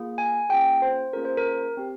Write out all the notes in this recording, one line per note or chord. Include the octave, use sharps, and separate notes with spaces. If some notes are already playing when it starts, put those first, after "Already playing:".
Already playing: A#3 F4 G#4
G#5
A#3 C#4 F4 G#4 G5
C5
A#3 C#4 F4 G#4 A#4
C5
A#4
C4 G4